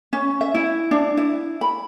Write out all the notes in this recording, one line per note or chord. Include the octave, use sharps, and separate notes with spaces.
C#4
E5
E4
D4
E4
B5